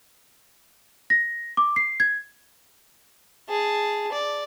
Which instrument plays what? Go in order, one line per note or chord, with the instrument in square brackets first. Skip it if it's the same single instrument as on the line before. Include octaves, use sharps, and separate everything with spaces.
[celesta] A#6
D6
C7
G#6
[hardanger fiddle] G#4 A5
D5